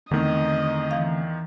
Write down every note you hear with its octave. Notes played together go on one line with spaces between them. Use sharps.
E2 D3 D#3 A3 C4 D#5
E3 F5